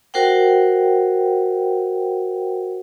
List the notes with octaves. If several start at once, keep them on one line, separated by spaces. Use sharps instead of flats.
F#4 A#4 C5 F#5 G5